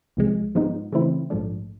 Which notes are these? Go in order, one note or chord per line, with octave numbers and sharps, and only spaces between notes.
C2 C3 F3 G#3
G#2 F3 G#3 B3 D#4
C#3 E3 A3 C4 E4
A#1 G#2 F3 A3 D4